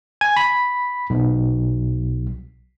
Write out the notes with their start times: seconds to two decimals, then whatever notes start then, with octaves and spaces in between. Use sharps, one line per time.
0.21 G#5
0.37 B5
1.10 B1